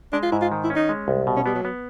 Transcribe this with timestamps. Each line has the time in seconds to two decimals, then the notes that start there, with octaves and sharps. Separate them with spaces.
0.13 G#3 D4
0.23 F4
0.32 G#2 E4
0.42 F4
0.52 D#3
0.64 E4
0.70 C#4
0.76 D#4
0.89 G#3
1.08 C2
1.27 B2
1.36 C#4
1.46 G3 B3
1.55 F#3
1.65 B3